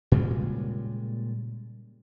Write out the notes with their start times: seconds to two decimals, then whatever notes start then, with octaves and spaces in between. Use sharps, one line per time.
0.12 A#2 C#3 G3 G#3